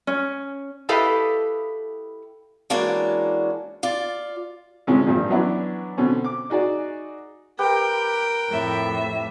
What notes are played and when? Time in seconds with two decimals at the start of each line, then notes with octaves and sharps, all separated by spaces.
0.07 C#4
0.89 E4 G4 A4 B4 D#5 F5
2.70 E3 G#3 A#3 C#4 D4 F#4
3.83 F4 D5
4.87 D2 C3 E3 F3 G#3 C#4
5.07 A#1 G2 G3
5.29 E3 F#3 B3 C#4 D4 E4
5.98 B2 D3 C4 C#4
6.24 D6
6.50 D#4 F#4 G#4 D5
7.59 G4 A#4 B4 G5
8.48 F2 A2 E5